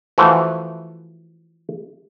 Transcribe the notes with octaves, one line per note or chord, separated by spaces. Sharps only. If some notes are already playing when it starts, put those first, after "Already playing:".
E3 F3 A3 F#4